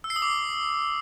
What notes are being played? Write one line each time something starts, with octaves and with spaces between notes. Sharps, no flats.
E6
C7
D#6
D6